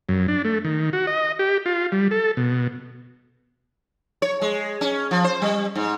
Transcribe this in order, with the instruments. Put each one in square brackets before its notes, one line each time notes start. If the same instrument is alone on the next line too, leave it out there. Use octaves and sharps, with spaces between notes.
[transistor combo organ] F#2
D4
A3
D#3
F#4
D#5
G4
F4
G3
A4
B2
[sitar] C#5
G#3
C#4
F3
C5
G3
G#2